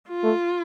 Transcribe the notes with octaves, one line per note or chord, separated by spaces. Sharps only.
F4
A3